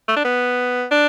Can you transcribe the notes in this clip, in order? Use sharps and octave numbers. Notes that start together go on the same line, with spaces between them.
A3
D4
B3
D4